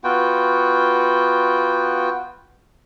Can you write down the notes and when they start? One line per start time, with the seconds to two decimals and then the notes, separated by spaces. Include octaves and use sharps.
0.04 B3 F4 F#4 G5